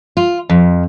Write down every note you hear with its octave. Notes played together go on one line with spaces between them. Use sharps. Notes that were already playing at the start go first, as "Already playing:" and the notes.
F4
F2